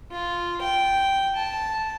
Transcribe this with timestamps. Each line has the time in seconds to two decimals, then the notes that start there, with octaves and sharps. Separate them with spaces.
0.12 F4
0.61 G5
1.36 A5